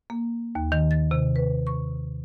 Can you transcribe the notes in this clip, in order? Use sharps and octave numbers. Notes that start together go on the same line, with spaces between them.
A#3
D#2
D#3
A6
C3
B4
C#6